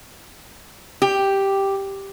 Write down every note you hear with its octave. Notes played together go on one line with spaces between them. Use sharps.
G4